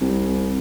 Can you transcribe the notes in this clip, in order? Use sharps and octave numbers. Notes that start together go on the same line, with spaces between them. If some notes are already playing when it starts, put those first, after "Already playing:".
C2